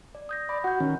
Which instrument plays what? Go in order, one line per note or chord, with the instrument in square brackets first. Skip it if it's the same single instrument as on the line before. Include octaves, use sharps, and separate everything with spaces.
[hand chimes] D5
D#6 G6 A#6
[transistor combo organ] D5 [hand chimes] B5
[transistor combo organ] F#4 [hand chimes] F#5 G6
[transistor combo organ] D#3 C#4